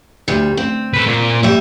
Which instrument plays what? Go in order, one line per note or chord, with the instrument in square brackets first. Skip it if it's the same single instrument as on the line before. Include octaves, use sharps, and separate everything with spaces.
[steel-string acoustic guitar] D2 G3
C4
[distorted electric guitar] A4 B4
A#2
[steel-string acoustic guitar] G3 E5